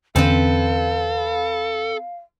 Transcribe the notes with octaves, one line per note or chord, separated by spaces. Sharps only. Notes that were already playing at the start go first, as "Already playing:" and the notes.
E2 D3 C4 C#4 A4 B4 F5